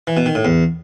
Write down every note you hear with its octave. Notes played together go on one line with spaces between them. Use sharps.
E3
B2
D#3
A2
E2